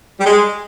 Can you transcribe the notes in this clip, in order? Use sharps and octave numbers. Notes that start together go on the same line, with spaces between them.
G3
G#3